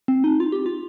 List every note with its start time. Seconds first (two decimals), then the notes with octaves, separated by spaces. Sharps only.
0.08 C4
0.24 D#4
0.40 F4
0.52 G4
0.66 F4